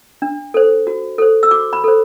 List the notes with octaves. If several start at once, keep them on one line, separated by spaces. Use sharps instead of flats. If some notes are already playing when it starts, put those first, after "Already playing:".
D4
A4 C5
F#4
A4 C5
E6
F#4 D6
B5
A4 C5